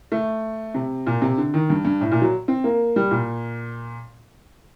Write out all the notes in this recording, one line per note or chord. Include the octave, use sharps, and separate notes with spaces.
A3
C3
A#2
C3
D3
D#3
G2
G2
A2
A#2
F#3
C4
A#3
G3
A#2